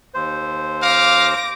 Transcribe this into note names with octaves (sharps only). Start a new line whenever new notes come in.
D#2 C5
F5 D6 A#6